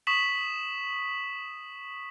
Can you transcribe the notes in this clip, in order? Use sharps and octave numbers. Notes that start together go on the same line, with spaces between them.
C#6 D#6 B6 E7 F#7